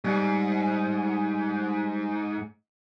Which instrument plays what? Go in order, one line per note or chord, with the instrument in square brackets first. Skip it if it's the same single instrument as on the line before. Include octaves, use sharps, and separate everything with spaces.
[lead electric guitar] G#2 [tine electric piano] G3